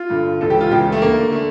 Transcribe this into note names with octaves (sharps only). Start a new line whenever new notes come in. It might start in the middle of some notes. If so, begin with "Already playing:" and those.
Already playing: F4
G2 D3
C#2 C#3 E3 A4
G4
F4
C#2 C#3 E3 G4
A3
D2 D3 A#3
D3 A3